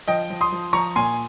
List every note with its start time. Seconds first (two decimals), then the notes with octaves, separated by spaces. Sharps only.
0.08 F3 D#5 G5
0.30 F3
0.41 C6 D#6
0.52 F3
0.73 F3 A#5 C#6
0.96 A#2 G#5 C6